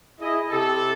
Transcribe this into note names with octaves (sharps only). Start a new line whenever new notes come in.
E4 G#4 D#5
C3 G4 A4